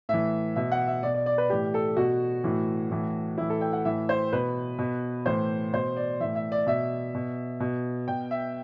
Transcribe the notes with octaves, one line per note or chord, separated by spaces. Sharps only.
A2 E3 E5
B2 E5
F#5
E5
B2 D5
D5
D5
B4
A2 E3 G4
A4
B2 F#4
A2 E3
A2 E3
A2 E3 E4
A4
G5
F#5
A2 E3 E5
C5
B2 B4
B2
A2 E3 C5
B2 C5
D5
A2 E3 E5
E5
D5
B2 E5
B2
B2
B2 G5
E5